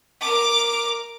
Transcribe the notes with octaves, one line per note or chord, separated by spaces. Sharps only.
A#4 D6